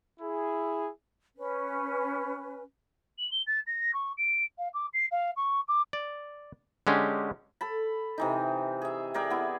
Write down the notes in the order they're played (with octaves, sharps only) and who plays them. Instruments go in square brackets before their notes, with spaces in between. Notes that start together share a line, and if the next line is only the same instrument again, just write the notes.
[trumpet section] E4 G#4
[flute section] C#4 B4
[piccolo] F#7
G7
A6
A#6
C#6
D7
F5
D6
C7
F5
C#6
D6
[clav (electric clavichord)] D5
D3 G#3 C#4 G4
[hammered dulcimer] A4 A5 B5
C3 E3 D#4
G#4 E5
G#4 A#4 D5 G5
B3 E4